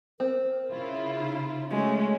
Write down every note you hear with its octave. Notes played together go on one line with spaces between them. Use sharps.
C4 A#4
C#3 E4 F4
D#4
G#3 A3 C#4 F#4